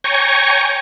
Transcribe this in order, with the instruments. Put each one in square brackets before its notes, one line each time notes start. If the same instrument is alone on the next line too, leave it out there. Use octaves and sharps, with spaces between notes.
[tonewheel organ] C#5 G5 G#5 A#5 C#6